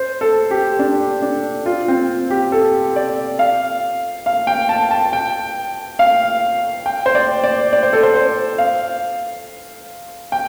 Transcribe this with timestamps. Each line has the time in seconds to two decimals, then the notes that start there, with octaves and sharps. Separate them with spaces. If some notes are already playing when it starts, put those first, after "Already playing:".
Already playing: C5
0.21 A4
0.51 G4
0.79 D4
1.22 D4
1.66 F4
1.88 C4
2.30 G4
2.52 A4
2.96 D5
3.39 F5
4.26 F5
4.47 G5
4.69 A5
4.91 A5
5.13 G5
5.99 F5
6.86 G5
7.06 C5
7.15 D5
7.44 D5
7.73 D5
7.83 C5
7.93 A4
8.03 C5
8.15 C5
8.58 F5
10.32 G5